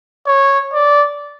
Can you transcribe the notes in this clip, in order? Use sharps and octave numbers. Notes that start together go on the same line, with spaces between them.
C#5
D5